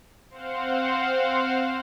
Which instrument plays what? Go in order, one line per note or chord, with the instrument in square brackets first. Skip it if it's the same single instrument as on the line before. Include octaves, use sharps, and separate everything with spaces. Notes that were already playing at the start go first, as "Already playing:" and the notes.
[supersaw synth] C4 C5 F5 F#5